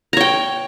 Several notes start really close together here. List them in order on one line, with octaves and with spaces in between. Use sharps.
A#5 C#5 G5